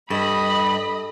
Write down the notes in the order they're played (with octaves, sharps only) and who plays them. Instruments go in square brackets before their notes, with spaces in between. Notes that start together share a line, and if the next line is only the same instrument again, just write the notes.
[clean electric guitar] G2 [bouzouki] A4 [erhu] D#5 [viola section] B5